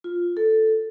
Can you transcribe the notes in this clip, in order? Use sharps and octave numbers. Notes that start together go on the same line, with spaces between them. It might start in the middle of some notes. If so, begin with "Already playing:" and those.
F4
A4